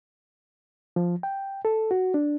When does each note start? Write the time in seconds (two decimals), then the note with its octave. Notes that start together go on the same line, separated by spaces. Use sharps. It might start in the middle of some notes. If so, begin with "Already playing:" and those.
0.96 F3
1.23 G5
1.65 A4
1.91 F#4
2.14 D4